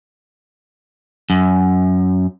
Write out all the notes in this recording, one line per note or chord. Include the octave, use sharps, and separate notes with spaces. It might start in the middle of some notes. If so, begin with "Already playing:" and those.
F#2